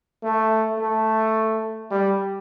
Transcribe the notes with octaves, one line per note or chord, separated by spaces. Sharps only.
A3
A3
G3